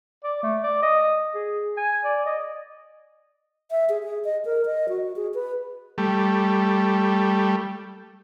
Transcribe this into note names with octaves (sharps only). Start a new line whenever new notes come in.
D5
A3
D5
D#5
G#4
G#5
D5
D#5
E5
G#4
G#4
D#5
A#4
D#5
F#4
G#4
B4
G3 A3